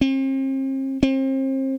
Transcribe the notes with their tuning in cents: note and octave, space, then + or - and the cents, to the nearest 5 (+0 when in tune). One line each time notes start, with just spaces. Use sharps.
C4 +40
C4 +35